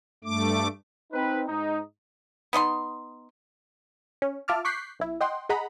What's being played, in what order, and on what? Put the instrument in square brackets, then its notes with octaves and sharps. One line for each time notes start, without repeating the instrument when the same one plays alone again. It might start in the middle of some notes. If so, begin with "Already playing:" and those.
[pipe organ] G2 A3 D6
[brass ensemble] C4 D#4 B4
G#2 D#4
[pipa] B3 D#4 D#5 C6
[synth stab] C#4
F4 E5 A5 D6 F6
C#6 D6 F#6 G6 B6 C7
B1 E4
D#5 F#5 G5 C6
G#4 D#5 F#5 A#5 B5